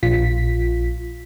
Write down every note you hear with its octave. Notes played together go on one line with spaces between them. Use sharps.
A#1 F4 B6